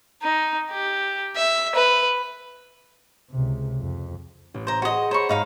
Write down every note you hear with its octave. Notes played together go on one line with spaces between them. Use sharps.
D#4
G4
E5
B4
C#2 C3
F2
A1
C5 A#5
F#4 G#4 C5 D#5
C5 C#5 A#5 B5 C#6
G#2 D#4 F5 B5